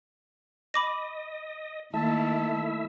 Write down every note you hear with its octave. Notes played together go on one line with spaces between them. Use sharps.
D#5 B5 D6 A#6
D#3 A3 A#3 E4 E5 A5